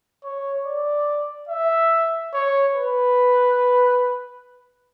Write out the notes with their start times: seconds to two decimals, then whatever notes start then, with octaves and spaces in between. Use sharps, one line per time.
0.24 C#5
0.66 D5
1.49 E5
2.33 C#5
2.74 B4